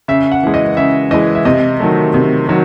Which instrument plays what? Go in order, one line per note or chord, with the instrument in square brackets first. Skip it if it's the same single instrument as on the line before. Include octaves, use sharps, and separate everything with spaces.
[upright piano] C#3 E5
F#5
E3 G#3
D#5
C#3 E5
E3 G#3 D#5
E5
C3 D#5
D#3 F#3 A3
C3
D#3 F#3